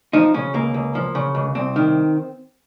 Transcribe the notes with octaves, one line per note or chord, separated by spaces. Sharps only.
F3 D#4
C#3 C#4
C#2 A#3
C#2
F3
C#3
C#2
C2 C4
D#3